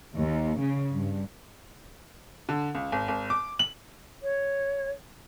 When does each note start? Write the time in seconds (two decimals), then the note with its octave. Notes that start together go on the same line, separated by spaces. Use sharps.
0.17 D#2
0.60 C#3
0.95 G2
2.49 D3
2.75 C#2
2.92 G#1
3.08 G#1
3.30 D6
3.59 F#7
4.22 C#5